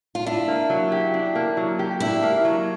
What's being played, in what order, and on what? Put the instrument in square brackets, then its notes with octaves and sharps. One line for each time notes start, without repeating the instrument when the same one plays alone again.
[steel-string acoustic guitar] F4
[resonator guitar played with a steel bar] D4 [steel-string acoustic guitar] E4
[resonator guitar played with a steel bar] A#3
F#3
G4
D4
A#3
F#3
G4
[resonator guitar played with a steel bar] D4 [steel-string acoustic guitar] E4
[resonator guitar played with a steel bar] A#3
F#3